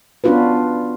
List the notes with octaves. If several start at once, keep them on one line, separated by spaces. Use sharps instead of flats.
B3 C#4 D4 F4 F#4 B4